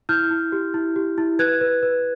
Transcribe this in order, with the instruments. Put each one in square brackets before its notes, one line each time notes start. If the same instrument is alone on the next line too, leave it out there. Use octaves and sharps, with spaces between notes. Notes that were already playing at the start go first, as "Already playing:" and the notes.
[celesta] E4 F6 G6
E4
G4
E4
G4
E4
B4 F#6 G#6
B4
B4